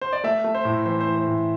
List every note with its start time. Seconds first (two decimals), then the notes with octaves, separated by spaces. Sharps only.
0.01 C5
0.13 D5
0.24 A3 E5
0.44 A3
0.55 C5
0.65 A2
0.86 E3 C5
1.01 C5
1.06 E3
1.16 C5
1.27 A2